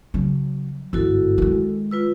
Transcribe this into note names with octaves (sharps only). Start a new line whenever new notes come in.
C#3 F#3
G1 G#2 E4 F#4 A4
D#3 G#3
F4 B4 E6